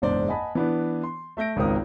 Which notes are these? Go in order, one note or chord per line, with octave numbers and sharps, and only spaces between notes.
F#1 E2 G#2 D4 C5 D5
D#5 F#5 G#5 A5 B5
E3 B3 D4
C6
A3 E5 G6 A#6 D7
G#1 C#2 D#3 C4 A#4 D#6